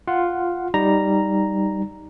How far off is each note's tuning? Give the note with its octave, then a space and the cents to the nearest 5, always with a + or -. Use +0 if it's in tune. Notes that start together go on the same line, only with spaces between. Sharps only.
F4 +0 F#5 +0
G3 +0 D#4 +0 A#5 +0